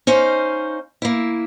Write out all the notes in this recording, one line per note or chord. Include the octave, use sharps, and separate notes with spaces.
C#4 D#4 C5 F5
A#3 E4